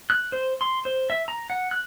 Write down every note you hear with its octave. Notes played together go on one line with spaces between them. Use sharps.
F#6
C5
C6
C5
E5
A#5
F#5
F#6